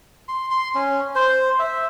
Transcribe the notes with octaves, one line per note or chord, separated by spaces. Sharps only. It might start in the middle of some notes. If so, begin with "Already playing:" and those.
C6
C6
C#4
C5
E5